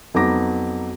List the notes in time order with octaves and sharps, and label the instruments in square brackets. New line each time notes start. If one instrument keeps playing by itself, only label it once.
[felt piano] F2 F#3 B3 D#4 D6 A#6